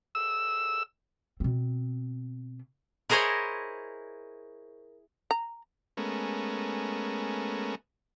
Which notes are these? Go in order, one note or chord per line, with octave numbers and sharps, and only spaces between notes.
E6
B2 C4
E4 G#4 A#4 C5 C#5 D#5
A#5
G#3 A3 B3 C#4 A#4